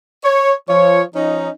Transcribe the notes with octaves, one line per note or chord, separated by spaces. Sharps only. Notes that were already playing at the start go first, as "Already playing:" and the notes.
C#5
F3 C#5
F3 C#4 D#4